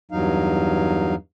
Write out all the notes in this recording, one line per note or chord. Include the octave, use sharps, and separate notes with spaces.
E2 G2 F#3 D#4 F5